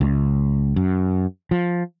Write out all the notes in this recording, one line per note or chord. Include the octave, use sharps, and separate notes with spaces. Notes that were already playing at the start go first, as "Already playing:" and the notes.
C#2
F#2
F3